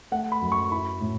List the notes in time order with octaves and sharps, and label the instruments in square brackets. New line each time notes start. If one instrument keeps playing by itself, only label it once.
[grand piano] A3 F#5
B5
F#2
C#6
E4 B5
A2